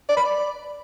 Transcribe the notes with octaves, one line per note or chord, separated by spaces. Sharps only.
D5
B5
D5